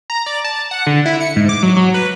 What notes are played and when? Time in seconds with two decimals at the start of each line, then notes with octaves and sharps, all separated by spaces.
0.10 A#5
0.26 D5
0.44 A5
0.71 F#5
0.86 D3
1.06 E4
1.20 C#7
1.36 G#2
1.49 D6
1.63 F#3
1.77 F#3
1.94 B4